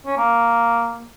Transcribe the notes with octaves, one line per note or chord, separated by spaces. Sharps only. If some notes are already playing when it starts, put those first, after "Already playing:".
C#4
A#3